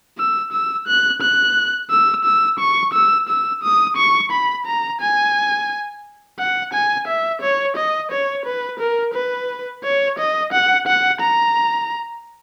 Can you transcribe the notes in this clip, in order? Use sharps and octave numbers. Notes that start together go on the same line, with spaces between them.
E6
E6
F#6
F#6
E6
E6
C#6
E6
E6
D#6
C#6
B5
A#5
G#5
F#5
G#5
E5
C#5
D#5
C#5
B4
A#4
B4
C#5
D#5
F#5
F#5
A#5